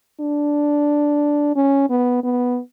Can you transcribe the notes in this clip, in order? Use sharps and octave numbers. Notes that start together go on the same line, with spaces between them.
D4
C#4
B3
B3